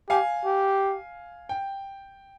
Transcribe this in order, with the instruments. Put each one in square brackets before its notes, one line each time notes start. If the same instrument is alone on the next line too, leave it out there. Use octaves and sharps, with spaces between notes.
[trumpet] G4 [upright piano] F5 G#5
[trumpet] G4
[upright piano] G5